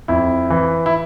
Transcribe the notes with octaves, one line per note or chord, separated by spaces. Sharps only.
F2 E4
E3
E4